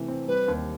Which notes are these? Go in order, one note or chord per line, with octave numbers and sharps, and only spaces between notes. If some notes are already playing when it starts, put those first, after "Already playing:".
Already playing: C3 E3 A3
C4
G3 B4
D#2